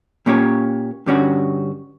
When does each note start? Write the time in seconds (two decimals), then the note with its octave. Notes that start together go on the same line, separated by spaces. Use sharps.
0.26 A#2 A#3 C#4 G4 C#5
1.06 G2 D3 G3 C#4 F#4